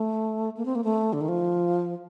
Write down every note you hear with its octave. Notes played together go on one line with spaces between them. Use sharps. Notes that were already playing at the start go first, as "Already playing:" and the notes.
Already playing: A3
A#3
C4
A#3
A3
D3
D#3
F3